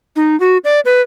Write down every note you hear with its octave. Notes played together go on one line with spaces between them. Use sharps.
D#4
F#4
D5
B4